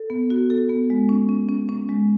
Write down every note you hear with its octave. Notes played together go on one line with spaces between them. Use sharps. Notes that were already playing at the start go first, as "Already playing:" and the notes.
Already playing: A4
B3
F#4
A4
B3
G#3
C#4
C#4
C#4
C#4
G#3